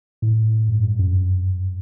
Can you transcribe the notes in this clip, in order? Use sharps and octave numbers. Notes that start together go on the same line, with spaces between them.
A2
G2
G2
F#2